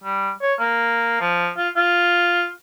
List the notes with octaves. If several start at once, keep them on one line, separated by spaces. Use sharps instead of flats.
G3
C#5
A#3
F3
F4
F4